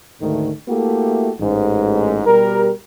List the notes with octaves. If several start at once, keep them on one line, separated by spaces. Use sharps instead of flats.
D2 G#2 D3 D#3 A3
A3 A#3 E4 F#4 G4 A4
A1 G#2
B2 G3 G4 A#4